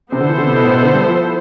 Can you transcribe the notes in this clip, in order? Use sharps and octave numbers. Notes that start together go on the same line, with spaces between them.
C3 B3 E4 A4 C5
D3
E3
D3
C3
B2
A2
B2
D3
G3
F3